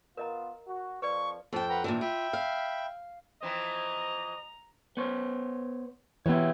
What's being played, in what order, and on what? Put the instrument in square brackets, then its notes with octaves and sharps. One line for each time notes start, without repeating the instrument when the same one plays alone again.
[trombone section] B3 F4 [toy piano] A#4 D#5 A#5
[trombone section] F#4
[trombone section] F2 F3 [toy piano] B4 D5 [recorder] C#6
[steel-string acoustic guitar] F2 G5 [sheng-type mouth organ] A5
[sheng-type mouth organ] B4 F#5 A#5
[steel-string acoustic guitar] A#2 D#3 E3 [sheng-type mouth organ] D4
[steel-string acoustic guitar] F4 [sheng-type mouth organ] E5 G5 B5
[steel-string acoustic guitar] F5
[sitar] E3 F3 C4 [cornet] D#5 [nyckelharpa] A#5
[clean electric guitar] B3 C5 C#5
[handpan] E3 B3 [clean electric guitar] E4 G4 C#5